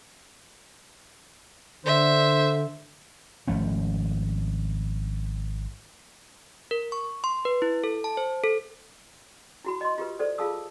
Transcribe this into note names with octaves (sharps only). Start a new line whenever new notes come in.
D3 C5 E5
G#1 F3 A3 C#4
A#4
C#6
C6
B4
E4
A4
A5
C5
A4
E4 F#4 B5
D#5 C6
F4 G4 A#4 B4
A4 C5 D5
F4 G#4 F5 A5 D#6 E6